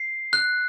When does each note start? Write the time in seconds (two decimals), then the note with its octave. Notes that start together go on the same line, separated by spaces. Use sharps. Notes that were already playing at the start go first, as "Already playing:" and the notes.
Already playing: C7
0.33 F#6